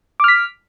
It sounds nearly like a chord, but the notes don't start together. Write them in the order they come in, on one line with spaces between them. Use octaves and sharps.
D6 F6 B6